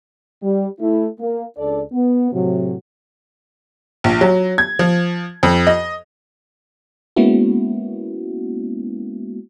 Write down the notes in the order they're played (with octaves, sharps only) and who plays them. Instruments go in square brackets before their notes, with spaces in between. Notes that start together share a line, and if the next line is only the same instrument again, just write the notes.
[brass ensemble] G3
A3 E4
A#3
C#2 D4 A4 D5
B3
A2 C3 F#3
[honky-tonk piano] A#1
F#3
G#6
F3
F2
D#5
[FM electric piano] G#3 A#3 B3 C#4 E4 F#4